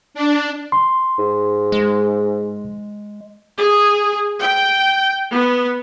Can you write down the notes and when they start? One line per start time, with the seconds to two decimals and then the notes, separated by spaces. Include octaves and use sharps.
0.14 D4
0.72 C6
1.19 G#2
1.72 G#3
3.58 G#4
4.42 G5
5.31 B3